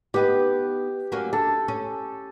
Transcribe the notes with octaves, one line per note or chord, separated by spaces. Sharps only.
B3 D#4 G4 B4
F#3 A#3 C#4
D4 A4
C#4